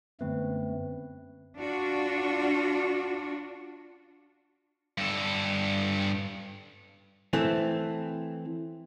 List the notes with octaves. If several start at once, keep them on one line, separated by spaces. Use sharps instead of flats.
F#2 D3 G#3 A3 B3 C4 B4
D4 F4 F#4
G2 A4
E3 A3 C4